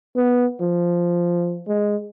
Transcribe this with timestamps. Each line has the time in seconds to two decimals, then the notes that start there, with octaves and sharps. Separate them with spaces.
0.17 B3
0.61 F3
1.68 G#3